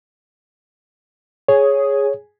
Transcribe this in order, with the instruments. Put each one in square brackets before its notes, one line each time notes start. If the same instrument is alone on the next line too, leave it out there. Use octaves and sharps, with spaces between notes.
[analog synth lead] G#4 [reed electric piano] C#5